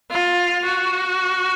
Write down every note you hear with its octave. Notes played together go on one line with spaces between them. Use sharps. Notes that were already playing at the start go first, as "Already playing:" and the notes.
F4
F#4